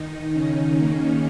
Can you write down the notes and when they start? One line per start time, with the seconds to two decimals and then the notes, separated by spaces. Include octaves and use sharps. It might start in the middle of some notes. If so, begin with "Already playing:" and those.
Already playing: D#3 D#4
0.33 C#3 C#4
0.77 A#3